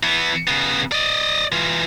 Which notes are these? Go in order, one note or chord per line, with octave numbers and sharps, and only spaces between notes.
E3 B3
C#3 B3
D5 D#5
E3 F4